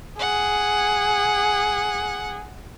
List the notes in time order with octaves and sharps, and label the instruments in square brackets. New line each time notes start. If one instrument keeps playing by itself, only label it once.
[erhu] G#4 [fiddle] F#5